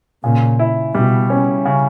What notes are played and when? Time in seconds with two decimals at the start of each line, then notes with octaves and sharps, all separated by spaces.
0.23 A#2 C#3
0.59 E4
0.95 B2 G3
1.30 C#4
1.65 C#3